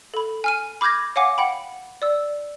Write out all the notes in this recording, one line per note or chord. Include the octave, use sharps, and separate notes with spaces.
A4 B5
G#5 F6 D#7
B5 D6 F6 G6 G#6 A#6
C#5 F5 F#5 G#5 D6
F#5 G5 B5
D5 E6